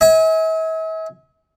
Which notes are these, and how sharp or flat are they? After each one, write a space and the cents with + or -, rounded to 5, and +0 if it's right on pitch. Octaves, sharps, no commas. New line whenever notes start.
E5 -45 G#5 +0